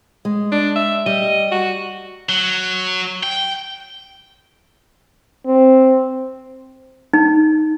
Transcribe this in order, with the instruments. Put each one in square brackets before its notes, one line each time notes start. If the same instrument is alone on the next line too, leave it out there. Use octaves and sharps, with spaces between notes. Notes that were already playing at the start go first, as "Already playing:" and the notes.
[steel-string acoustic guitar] G#3
[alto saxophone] D4
E5
[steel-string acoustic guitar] G3 [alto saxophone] D#5
[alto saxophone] F#4
[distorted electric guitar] F#3
G5
[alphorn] C4
[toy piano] D#4